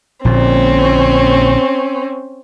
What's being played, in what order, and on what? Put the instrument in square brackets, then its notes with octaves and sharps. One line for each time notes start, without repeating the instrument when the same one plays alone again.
[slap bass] A#1 A#2 D3 [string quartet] C4 C#4